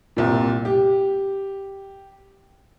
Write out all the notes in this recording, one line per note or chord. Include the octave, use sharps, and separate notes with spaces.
C2 A#2
G4